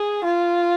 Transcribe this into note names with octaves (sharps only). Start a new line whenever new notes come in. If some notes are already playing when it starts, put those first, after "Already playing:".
Already playing: G#4
F4